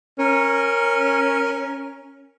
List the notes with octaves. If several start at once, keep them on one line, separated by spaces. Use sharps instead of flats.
C#4 A#4